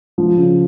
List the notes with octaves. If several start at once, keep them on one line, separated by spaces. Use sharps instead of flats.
F3
C#3